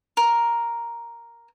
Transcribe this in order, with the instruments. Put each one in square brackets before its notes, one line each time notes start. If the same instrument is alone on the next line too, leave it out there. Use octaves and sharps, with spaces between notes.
[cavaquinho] A#4